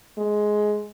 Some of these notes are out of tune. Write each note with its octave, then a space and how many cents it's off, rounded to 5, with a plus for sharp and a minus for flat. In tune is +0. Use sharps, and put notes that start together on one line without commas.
G#3 +10